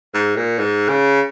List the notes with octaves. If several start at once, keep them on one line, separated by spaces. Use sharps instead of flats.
G#2
A#2
G#2
C#3